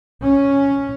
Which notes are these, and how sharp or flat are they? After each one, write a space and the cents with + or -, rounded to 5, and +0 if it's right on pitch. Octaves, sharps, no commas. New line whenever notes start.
C#4 +0